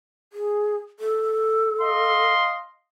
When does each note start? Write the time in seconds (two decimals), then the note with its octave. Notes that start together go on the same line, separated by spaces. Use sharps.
0.33 G#4
1.00 A4
1.80 D#5 F5 C6